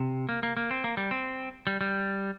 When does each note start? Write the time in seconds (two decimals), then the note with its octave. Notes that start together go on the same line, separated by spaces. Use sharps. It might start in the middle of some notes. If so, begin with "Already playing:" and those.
Already playing: C3
0.29 A#3
0.43 A#3
0.57 A#3
0.71 C4
0.84 A#3
0.97 G3
1.11 C4
1.67 G3
1.81 G3